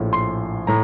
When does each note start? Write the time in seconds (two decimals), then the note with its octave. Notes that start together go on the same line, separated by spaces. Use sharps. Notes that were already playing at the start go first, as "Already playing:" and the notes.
Already playing: A#1 A2 F3
0.13 C6
0.67 A2 A#5